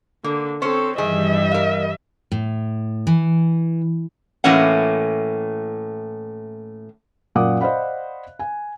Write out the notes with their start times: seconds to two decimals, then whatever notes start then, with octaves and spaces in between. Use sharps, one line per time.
0.24 D3 A#3
0.62 C4 C#4 A4 C5 C#5
0.98 G2 D#3 E3 G3 G#4 D#5 E5
1.52 A#4 F5
2.32 A2
3.07 E3
4.44 A2 E3 A3 A#3 C#4 F#5
7.35 F#2 A#2 F#5 D6 D#6 F#6
7.61 C5 D5 D#5 F5 F#5 B5
8.39 G#5